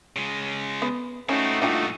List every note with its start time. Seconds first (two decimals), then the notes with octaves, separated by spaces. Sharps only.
0.16 C#3 G#3
0.82 B3
1.29 A3 C4 C#4 D#4 E4 F#4
1.62 G2 A#2 D4 F4 G5